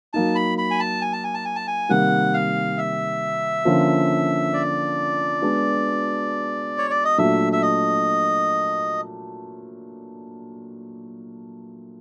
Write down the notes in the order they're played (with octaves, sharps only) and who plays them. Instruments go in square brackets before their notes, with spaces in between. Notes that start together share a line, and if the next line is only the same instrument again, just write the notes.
[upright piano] F#3 A#3 D#4 [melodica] A5
[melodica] B5
B5
G#5
A5
G#5
A5
G#5
A5
G#5
A5
G#5
[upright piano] C3 D#3 G3 A#3 [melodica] F#5
[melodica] F5
E5
[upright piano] D3 F3 A#3 C#4
[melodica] D5
[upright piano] G#3 B3 D4 F#4
[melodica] C#5
D5
D#5
[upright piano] A#2 F#3 A3 D4 [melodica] E5
[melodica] E5
D#5